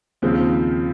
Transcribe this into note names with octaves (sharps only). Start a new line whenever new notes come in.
D#2 C#3 F3 C4